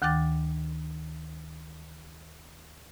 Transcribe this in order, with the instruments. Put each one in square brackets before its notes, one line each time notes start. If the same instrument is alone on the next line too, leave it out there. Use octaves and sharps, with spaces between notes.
[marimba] D2 D#3 G5 D6 A6